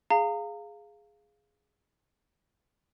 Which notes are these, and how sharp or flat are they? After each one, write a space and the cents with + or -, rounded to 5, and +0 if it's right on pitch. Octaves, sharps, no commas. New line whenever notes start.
G#4 +0 F5 +0 A#5 -30